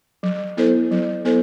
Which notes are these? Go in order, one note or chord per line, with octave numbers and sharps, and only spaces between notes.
F#3
B3 E4 A4 C5
F#3
B3 E4 A4 C5